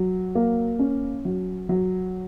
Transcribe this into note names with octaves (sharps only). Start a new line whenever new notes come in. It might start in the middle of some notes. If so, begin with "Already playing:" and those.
Already playing: F#3
A#3
C#4
F#3
F#3